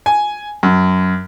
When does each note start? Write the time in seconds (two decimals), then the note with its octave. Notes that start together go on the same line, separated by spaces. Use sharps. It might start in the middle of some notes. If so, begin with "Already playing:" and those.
0.06 G#5
0.63 F#2